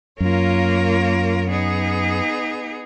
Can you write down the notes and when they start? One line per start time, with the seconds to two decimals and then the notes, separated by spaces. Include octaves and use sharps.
0.20 F#2 A#3 F4 A#4 C#5
1.46 B3 D#4 G#4